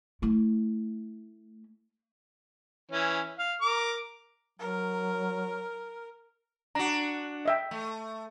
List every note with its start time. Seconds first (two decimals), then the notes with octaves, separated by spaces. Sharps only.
0.22 A3 E4
2.92 E3 C#4
3.39 F5
3.61 A#4 D6
4.59 F#3 A#4
6.75 D4 F#4 A#5
7.45 D#5 E5 G5
7.71 A3